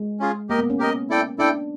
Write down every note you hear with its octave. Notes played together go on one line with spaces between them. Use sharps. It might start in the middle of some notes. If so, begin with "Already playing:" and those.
Already playing: G#3
C#4 F4 G#4
A#3 G4 A#4 D#5
B3
C#4
G4 A#4 D#5
E4 A4 D5 G5
D4 E4 A4 D5 G5